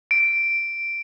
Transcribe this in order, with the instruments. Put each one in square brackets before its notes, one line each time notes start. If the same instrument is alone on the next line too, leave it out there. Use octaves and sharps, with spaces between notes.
[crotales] D7